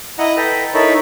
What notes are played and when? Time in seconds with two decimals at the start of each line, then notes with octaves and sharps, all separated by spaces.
0.19 E4 D#5 F#5 A#5
0.37 A4 B4 G5 A#5
0.74 D#4 E4 A4 A#4 C#5 B5